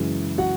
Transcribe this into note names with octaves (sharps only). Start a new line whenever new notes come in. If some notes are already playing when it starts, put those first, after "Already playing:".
Already playing: F#2 C#3 E3 G#3
F#4 F#5